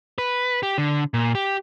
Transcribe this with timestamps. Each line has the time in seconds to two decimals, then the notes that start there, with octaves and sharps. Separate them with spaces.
0.18 B4
0.63 G4
0.78 D3
1.14 A#2
1.35 G4